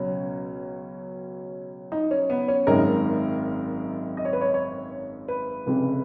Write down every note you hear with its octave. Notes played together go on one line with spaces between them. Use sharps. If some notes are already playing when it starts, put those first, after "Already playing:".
Already playing: C#2 B2 F#3 C#4
D#4
C#4
B3
C#4
G#1 F#2 D#3 G#3 A#4
D#5
C#5
B4
C#5
C#5
B4
F1 F2 C#3